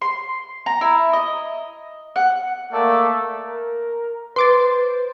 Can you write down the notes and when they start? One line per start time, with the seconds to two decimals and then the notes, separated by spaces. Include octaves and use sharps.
0.02 C6
0.66 A#5
0.81 E4
1.13 D#5
2.16 F#5
2.72 A3 A#3 A4 D5
3.43 A#4
4.36 B4 C5 C6 D6 A6